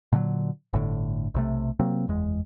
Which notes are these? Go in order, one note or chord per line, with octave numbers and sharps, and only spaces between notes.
A#2 D3 F3 F#3
G1 A2 D3
B1 C3 A3
C3 F#3 A#3 C4
F#1 E2 G#3